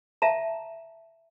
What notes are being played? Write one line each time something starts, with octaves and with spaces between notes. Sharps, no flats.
E5 F5 A5 A#5